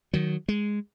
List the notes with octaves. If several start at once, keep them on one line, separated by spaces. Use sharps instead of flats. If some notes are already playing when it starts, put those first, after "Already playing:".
D#3 F#3
G#3